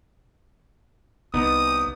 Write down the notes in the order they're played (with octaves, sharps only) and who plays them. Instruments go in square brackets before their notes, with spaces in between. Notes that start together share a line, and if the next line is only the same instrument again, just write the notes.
[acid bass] C2 [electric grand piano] B3 D#4 [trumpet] D#6